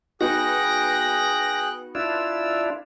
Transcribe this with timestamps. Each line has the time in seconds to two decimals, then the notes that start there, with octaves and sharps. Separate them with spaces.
0.21 B3 D#4 F#4 G#4 G5 F#6 A#6
1.95 D4 E4 F4 E6